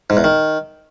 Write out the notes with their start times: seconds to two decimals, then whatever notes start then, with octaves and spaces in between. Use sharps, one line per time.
0.10 G#2
0.17 E2
0.24 D#3